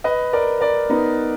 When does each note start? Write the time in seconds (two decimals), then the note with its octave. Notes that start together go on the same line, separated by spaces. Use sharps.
0.04 B4 D#5
0.33 A#4 D5
0.61 A#4 D5
0.90 B3 D#4